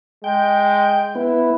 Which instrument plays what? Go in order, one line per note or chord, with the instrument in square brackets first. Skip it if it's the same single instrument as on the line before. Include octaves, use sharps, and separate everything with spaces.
[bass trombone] G#3 [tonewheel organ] G5
[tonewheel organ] B3 [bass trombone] E4